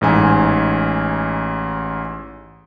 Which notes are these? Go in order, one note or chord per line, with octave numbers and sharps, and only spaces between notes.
A1 G#2 G#5